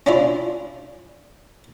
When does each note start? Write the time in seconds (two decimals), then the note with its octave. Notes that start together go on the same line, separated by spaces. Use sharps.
0.06 C#4 D4 E4 F4